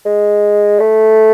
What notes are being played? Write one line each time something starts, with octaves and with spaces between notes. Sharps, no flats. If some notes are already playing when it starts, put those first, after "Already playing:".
G#3
A3